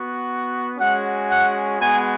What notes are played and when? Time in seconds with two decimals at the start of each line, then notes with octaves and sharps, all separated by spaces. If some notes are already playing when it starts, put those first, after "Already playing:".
Already playing: B3 F#4
0.76 G#3 C#4 F#4 F#5
1.28 F#5
1.79 G#3 B3 F#4 G#5